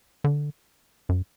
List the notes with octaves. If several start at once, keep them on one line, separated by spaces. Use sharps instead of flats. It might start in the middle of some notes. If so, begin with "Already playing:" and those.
D3
F#2